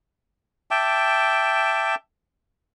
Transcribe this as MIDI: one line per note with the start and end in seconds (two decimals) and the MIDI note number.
0.71 1.95 76
0.71 1.95 79
0.71 1.95 81
0.71 1.95 86